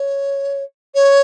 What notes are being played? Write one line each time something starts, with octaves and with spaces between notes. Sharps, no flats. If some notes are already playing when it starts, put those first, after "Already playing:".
Already playing: C#5
C#5